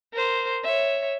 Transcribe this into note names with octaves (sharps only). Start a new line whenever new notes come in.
A#4 C5
C#5 E5